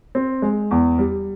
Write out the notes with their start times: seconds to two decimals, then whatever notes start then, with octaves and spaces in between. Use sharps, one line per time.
0.15 C4
0.42 G#3
0.71 E2
0.99 G3